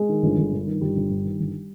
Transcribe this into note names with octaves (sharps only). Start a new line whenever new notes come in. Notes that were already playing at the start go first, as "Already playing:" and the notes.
Already playing: G#3
D#3
G1
G1
G2
D#3
G1 G3
G1
G2
D#3
G1